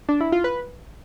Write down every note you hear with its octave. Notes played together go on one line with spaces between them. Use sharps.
D4
E4
F4
B4